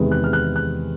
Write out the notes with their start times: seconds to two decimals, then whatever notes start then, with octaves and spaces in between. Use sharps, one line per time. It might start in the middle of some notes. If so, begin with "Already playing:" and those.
Already playing: E2 C3 D#3 G#3 B3
0.11 F#6
0.24 F6
0.33 F#6
0.56 F#6